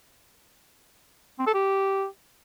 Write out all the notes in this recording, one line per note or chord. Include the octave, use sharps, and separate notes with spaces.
C4
A4
G4